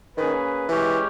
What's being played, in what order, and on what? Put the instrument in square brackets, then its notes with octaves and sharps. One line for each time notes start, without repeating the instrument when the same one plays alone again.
[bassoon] D#3 [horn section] A#3 C#4 G#4 B4
[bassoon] E3 [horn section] G#3 C#4 G4